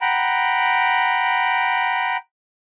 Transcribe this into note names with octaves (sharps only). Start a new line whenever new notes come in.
F#5 G5 A#5 B5